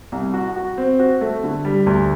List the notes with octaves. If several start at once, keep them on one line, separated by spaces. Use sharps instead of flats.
C2
F#4
F#4
C4
F#4
A3
D3
G3
D2